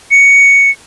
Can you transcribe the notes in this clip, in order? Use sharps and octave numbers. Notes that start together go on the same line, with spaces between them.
C#7